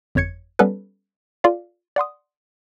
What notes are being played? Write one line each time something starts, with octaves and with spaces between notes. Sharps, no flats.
G1 F2 C#5 G#6 C#7
G3 B3 C#4 A4 B4
F4 A4 D5 F5
D5 F#5 C6 D#6